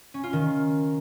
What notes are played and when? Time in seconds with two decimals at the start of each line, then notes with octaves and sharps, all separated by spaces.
0.14 C#4
0.23 F4
0.33 D#3